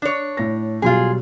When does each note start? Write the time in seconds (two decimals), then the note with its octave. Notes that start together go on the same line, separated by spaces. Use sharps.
0.02 D4 C#5 D5
0.37 A2 A#6
0.82 B2 F#3 G3 F4 G#4